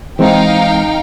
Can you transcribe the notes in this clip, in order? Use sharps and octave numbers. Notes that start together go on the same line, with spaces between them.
E3 G#3 C4 D#4 F5 G5